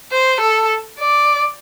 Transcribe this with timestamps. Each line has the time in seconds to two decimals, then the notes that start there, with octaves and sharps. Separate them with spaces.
0.12 C5
0.40 A4
0.99 D5